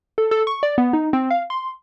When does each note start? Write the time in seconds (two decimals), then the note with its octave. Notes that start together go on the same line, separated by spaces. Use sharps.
0.18 A4
0.31 A4
0.47 C#6
0.63 D5
0.78 B3
0.93 D#4
1.13 C4
1.30 F5
1.50 C6